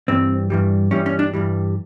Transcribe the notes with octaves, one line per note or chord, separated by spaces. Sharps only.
G2 E3 G3 C4
G2 E3 G3
G2 E3 G3 C#4
C#4
D4
G2 E3 G3